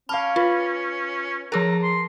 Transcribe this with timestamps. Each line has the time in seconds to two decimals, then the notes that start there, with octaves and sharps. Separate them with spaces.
0.09 C#4 F5 A5 B5 D6 F6
0.36 F4 B4
1.52 F3 G#4 A#4 A5 A#5 D6 F6
1.83 C6